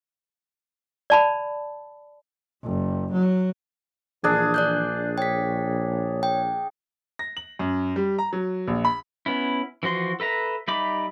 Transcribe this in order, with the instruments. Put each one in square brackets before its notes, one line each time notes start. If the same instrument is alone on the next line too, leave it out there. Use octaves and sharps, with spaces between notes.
[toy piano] D5 A5 B5
[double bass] F#1
F#3
[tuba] A#1 [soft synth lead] E3 [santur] D4 G#4
[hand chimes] D5 F#6 G6
[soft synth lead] C#5 [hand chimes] G5 B6
[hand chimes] G5
[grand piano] A#6
F#7
F#2
G3
A#5
F#3
A#1
B5
[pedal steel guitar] B3 C#4 E4
E3 F3 F#4 C6
A4 B4 E5 A#5
G3 D#4 E5 B5 D6